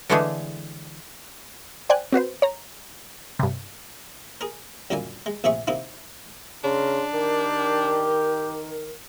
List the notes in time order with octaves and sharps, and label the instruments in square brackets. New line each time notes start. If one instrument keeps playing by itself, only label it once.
[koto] D3 E3 G#3 A3 D4 G#4
[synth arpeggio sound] C5 D5 G5 G#5 F#6
C4 F#4 B4 C5
C#5 A#5
G2 C3
[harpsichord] G#4 A#4
C2 F#2 A#2 D3 A#3 G#5
G#3
A#1 C3 A3 G#4 E5 C#6
C3 A#3 D#4 E4
[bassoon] C#3 [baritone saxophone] D4 [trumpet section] A#4 C6
[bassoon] D#3 [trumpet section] G4 [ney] A#4